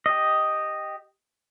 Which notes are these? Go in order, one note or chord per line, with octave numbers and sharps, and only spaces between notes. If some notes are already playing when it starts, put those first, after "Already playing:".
G4 D#5